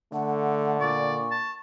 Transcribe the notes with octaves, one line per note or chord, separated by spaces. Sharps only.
D3 A3 F#5
A#2 D5 C#6
A5